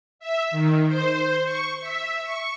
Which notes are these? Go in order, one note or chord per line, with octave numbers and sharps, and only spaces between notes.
E5
D#3
C5
C#6
E5
C#6